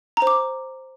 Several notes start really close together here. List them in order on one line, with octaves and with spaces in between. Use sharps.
A#5 C5 D6